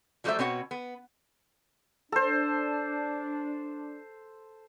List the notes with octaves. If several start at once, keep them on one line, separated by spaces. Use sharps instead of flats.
F#3 G3 A3 F4 C5 E5
B2 C4 C#5 F#5
B3
D4 A4 C5